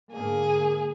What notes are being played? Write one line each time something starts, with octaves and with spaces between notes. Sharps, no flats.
G#2 D3 A#3 G#4